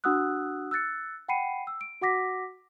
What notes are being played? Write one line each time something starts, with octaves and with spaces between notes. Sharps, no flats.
D4 F#4 F#5 D#6 E6 F#6
E6 F#6 A6 C#7
F#5 G5 B5 C7 C#7 D#7
E6
D7
F#4 F#5 D6 A#6 B6